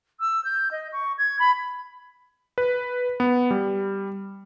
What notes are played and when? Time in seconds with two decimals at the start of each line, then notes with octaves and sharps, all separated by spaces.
0.20 E6
0.44 G6
0.71 D#5
0.92 C#6
1.18 G#6
1.39 B5
2.58 B4
3.20 B3
3.51 G3